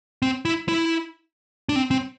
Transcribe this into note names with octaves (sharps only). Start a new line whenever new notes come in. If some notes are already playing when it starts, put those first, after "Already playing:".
C4
E4
E4
D4
C4
C4